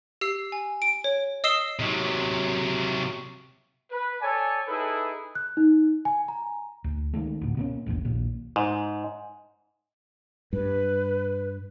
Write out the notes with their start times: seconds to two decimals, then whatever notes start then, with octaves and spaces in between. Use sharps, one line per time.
0.21 G4 E6 C7
0.52 G#5
0.82 D7
1.04 C#5
1.44 D#5 D#6 E6 C7 E7 G7
1.79 C3 F#3
3.91 B4
4.21 A4 C#5 D5 G#5
4.67 D#4 E4 G#4 A4 B4
5.35 F#6
5.57 D#4
6.05 G#5
6.28 A#5
6.84 D2
7.13 D#3 G#3 A3
7.41 D2 A2
7.57 B2 A#3 C#4
7.86 E1 A#1 E2 A2
8.05 A#1 D#2 A#2
8.56 G#2
10.53 G2 B4